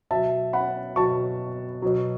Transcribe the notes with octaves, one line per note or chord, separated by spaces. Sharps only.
B2 F#3 E5 A5
F#5 B5
B2 F#3 A5 C#6
B2 F#3